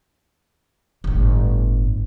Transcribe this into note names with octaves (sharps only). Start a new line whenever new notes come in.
G1 A2